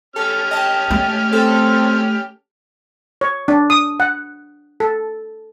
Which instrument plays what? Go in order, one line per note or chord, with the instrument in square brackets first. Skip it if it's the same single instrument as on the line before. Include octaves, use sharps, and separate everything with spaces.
[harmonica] C#4 G4 F6 [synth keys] A4
[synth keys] D#5 A5 [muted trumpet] G5
[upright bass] A3
[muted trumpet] C4 [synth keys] A4
[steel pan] C#5
D4
D#6
F#5
A4